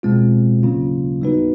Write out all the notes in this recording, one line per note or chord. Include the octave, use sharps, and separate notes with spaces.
B2 G#3 C4 F4
C#3 F#3 A#3 C#4 F4
G3 B3 D#4 F#4 B4